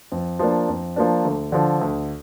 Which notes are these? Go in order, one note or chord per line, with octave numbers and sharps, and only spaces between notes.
F2
F3 A#3 D4
F2
F3 A#3 D4
D2
D3 F3
D2